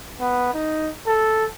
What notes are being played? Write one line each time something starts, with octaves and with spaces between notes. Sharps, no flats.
B3
D#4
A4